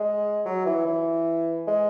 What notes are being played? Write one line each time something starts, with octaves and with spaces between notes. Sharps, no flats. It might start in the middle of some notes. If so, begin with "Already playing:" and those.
Already playing: G#3
F#3
E3
E3
G#3